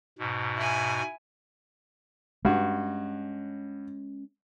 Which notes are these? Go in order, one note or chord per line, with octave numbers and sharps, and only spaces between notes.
G#2 B2
E4 G#5
G2 G#3 C#4 F#4